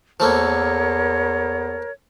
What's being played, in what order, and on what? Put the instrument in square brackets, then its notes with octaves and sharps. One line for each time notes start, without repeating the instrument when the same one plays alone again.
[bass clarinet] E2 [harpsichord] F3 A3 A#3 [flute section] A#4 C#5